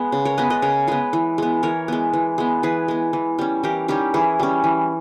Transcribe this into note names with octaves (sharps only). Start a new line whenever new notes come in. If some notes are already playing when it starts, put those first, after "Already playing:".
Already playing: G#3 B3
C#3
A#4 C#5
G#3 B3 B4 D#5
B4 D#5
C#3 A#4 C#5
G#3 B3 G#4 B4
E3
G#3 B3
E3 A#4 C#5
G#3 B3
E3
G#3 B3
E3 G#4 B4
G#3 B3
E3
G3 C#4
E3 G4 A#4
G3 C#4 D#4 G4
E3 E4 G#4
G3 C#4
E3